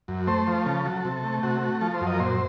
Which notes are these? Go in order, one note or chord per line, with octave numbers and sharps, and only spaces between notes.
F#2
A3 C5
F3
C#3 A4
F#3
C3
A3
C3 F#4
A3
F3 A4
C5
F#2
D#5
A#4
A#2 C5